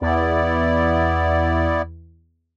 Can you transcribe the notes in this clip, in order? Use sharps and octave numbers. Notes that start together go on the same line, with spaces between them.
E2 B3 E4 D5